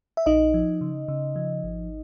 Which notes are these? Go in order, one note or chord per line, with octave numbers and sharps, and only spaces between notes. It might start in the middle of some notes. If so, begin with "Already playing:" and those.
E5
A#1 D#4 D#5
F3
C#3
C#3
F3
G#1